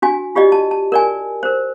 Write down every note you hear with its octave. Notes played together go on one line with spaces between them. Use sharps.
D4 F#4 G#5
F4 G4 D5 D#5
A5
A5
A#4 D5 G#5
A#4 C5